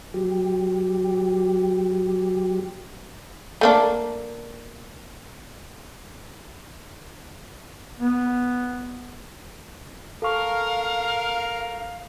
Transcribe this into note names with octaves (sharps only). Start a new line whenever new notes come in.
F#3 G4
A3 A#3 D4
B3
A4 A#4 F5 C#6